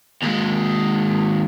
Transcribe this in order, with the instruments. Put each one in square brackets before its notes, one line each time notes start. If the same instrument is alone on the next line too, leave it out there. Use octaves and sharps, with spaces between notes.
[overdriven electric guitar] D#2 G#3